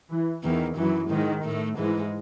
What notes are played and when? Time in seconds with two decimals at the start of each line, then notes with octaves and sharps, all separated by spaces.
0.10 E3
0.43 E2 D#3 E3
0.77 F#2 E3 F#3
1.10 G#2 D#3 G#3
1.45 A2 A3
1.77 G#2 E3 G#3